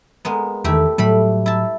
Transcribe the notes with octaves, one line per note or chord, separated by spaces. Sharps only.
G#3 A#3 B3
E2 D#3 A3 E4 G4
A2 F#3 G3 A3 B5
E4 A5